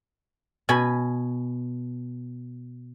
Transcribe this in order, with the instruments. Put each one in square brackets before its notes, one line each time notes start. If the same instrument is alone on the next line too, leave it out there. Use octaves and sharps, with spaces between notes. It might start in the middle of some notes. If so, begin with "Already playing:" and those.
[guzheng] B2 G#5 B5